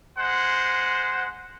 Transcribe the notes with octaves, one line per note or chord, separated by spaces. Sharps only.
G#3 C5 F#5